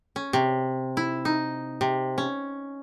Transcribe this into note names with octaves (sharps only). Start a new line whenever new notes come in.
C#4
C3
E4
D#4
C3
C#4